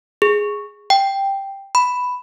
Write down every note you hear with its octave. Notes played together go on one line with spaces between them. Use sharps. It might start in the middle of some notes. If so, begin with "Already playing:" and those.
G#4
G5
B5